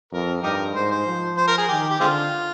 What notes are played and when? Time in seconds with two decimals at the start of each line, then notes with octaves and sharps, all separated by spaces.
0.12 F2 A#4
0.43 G2 D#4 G4 A#4
0.75 G#2 C5
0.91 C5
1.07 F3
1.37 C5
1.48 A#4
1.58 G#4
1.69 D#3 G4
1.90 G4
2.00 D3 G#3 C4 F4